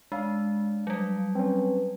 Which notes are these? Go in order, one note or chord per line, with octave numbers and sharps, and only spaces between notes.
G#3 D4 F5
F#3 G3
C4 C#4 B4